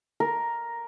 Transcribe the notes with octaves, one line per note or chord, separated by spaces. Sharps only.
A#4